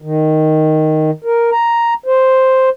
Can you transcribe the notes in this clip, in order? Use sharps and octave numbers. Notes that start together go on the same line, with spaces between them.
D#3
A#4
A#5
C5